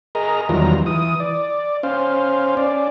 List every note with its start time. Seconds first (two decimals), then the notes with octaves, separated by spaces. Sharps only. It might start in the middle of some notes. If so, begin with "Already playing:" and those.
0.15 G#4 A#4 D#5 A#5
0.49 E2 D#3 F#3 G3 F4 A#5
0.86 E3 D#6
1.20 D5
1.83 C#4 C5 F5
2.57 C#4 D5